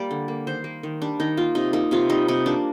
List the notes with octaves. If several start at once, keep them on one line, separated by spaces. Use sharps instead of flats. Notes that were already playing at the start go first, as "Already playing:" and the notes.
Already playing: G3 A#3 D5
D3
A#3
D#3 C5
A#3
D#3
G3 D4
D#3 D#4
A#3 F4
C3 D#4
A#3 D#4
C3 F4
G3 D#4
C3 D#4
A#3 D4